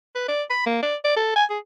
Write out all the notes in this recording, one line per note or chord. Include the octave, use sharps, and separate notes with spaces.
B4
D5
B5
A#3
D5
D5
A4
G#5
G#4